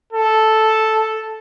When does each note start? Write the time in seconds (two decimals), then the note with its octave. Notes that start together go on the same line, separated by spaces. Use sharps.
0.13 A4